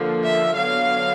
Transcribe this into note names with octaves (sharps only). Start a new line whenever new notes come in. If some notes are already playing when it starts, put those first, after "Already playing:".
Already playing: D3 F3 A#3
E5
D3 F#3 B3 F5